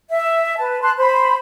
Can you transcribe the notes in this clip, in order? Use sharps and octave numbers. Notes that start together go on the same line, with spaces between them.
E5
B4 A5
A5 C6 F#6
C5 B5